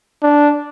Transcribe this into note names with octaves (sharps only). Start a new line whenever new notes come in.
D4